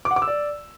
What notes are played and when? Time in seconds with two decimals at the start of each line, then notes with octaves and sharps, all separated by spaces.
0.05 D6
0.11 F#5
0.16 D6
0.22 E6
0.28 D5